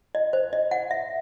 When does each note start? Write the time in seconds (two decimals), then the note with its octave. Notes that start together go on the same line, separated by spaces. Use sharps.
0.15 D#5
0.33 C5
0.53 D#5
0.71 F#5
0.91 E5